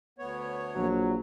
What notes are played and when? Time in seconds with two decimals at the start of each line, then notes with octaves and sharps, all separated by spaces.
0.18 D2 B3 C#5
0.76 A#1 F#3